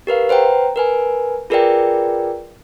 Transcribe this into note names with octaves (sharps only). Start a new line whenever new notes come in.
G4 A#4 B4 F5
B4 C5 F#5 G5 A#5
A#4 B4 G#5
F4 G#4 A#4 B4 D5 G5